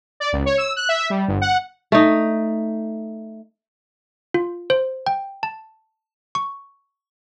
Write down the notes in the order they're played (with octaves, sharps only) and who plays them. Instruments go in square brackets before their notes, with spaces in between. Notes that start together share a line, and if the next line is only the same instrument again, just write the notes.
[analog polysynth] D5
C#2
C#5
E6
F#6
E5
G3
G1
F#5
[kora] A3 D#4
[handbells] F4
C5
G5
A5
C#6